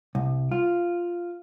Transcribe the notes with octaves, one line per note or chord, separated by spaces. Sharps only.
C2
F4